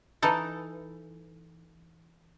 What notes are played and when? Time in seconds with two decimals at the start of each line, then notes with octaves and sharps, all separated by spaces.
0.22 E3 D#4 A4